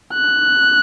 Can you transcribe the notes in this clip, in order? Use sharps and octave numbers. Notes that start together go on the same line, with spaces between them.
F#6